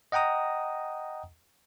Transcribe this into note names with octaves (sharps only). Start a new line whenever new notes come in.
D#5 F#5 G5 A#5 D#6